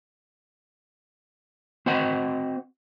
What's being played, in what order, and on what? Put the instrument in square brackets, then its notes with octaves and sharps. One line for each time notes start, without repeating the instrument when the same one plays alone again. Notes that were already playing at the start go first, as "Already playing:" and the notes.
[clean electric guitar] C4 F#4 C5 D#5 F#5